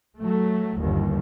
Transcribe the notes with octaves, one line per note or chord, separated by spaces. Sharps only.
F#3 A3
G1 D#2